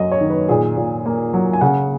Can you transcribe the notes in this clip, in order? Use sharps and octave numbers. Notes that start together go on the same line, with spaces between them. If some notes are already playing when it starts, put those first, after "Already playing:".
Already playing: F#2 F#3 A#3 D#5
C#5
D#3
B4
A#2 G#4
A#2
A#3
F#3
G#5
C#3 F#5